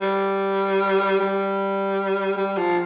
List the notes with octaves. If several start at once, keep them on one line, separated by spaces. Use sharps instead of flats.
G3
G3
G3
F3